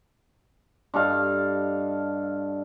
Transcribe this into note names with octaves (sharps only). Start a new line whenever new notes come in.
G2 A4 D#5 F5